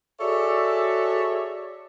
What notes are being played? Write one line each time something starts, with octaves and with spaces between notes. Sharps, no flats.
F#4 G#4 A4 C#5 D5 E5